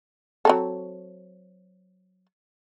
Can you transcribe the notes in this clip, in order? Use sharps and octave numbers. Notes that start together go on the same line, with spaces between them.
F#3 C4 A4